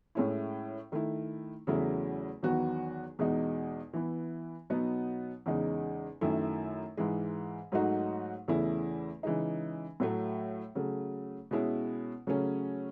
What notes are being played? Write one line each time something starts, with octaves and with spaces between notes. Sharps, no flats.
A2 G#3 C#4 E4
D#3 A3 E4
E2 C#3 F#3 A3 E4
E2 D#3 F#3 B3 F#4
E2 B2 G#3 D#4
E3 B3 E4
B2 F#3 B3 D#4
E2 C#3 G#3 D#4
F#2 D#3 A3 E4
G#2 E3 G#3
G#2 F#3 A3 D#4 F#4
E2 C#3 E3 A3 E4
C#3 E3 G#3 D#4
A2 F#3 A3
C#3 F#3 A3
B2 G#3 C#4 E4
C#3 F#3 A3 C#4